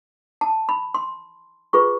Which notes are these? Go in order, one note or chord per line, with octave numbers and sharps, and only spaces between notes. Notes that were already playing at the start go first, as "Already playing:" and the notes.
A5
B5
C6
F4 G#4 B4 C#6